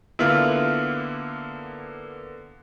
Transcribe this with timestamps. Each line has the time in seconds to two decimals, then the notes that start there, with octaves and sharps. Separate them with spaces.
0.19 D3 A#3 B3 E4 F4